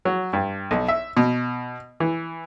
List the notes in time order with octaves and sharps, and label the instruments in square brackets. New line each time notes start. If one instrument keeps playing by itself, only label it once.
[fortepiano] F#3
G2
B1
E5
B2
E3